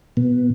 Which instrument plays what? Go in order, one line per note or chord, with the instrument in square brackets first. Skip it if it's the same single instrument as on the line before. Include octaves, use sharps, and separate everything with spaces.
[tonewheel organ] B2